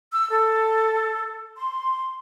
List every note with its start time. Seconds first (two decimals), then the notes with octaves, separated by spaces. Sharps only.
0.12 E6
0.29 A4
1.56 C6